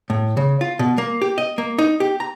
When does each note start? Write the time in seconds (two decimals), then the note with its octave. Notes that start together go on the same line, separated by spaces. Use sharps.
0.10 A2
0.37 C#3
0.61 F4
0.79 B2
0.98 A#3
1.22 G4
1.38 D#5
1.58 A#3
1.79 D#4
2.00 G4
2.20 A#5